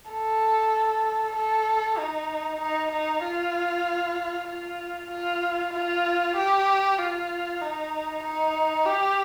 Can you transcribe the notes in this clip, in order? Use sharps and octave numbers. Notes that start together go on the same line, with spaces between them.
A4
A4
D#4
D#4
D#4
F4
F4
F4
F4
G4
F4
D#4
D#4
G4